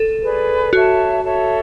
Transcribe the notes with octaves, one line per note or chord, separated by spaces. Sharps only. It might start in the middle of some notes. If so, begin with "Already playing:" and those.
Already playing: A4
G#4 B4 D5
F#4 A4 C#5 E5 A5
A4 C#5 E5 A5